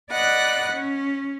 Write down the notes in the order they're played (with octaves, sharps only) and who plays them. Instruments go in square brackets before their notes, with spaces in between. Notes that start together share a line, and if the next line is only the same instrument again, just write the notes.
[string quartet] D5 D#5 F#5 B5 F#6
C#4